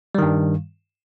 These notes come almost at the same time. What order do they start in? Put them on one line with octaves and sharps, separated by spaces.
G3 D#3 G2